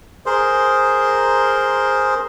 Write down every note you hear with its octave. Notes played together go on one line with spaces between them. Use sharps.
G#4 A#4 C5 C6